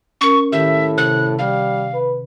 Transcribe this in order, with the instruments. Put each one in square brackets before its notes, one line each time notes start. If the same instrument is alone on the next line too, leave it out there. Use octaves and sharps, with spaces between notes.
[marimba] C#4 A#4 [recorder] C#6
[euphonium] A2 [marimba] D#3 G4 [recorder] E5
[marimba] C3 [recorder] F#6
[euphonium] G3 [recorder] F5
[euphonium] B4